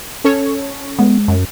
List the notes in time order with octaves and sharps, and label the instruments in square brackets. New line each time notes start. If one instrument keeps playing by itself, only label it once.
[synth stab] C#4 A4 C#5
[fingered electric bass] G#3 [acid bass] B3
[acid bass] F#2